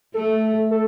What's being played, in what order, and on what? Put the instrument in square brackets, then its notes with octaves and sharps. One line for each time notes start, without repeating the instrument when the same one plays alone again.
[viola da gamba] A3 [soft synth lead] A4
[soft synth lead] A4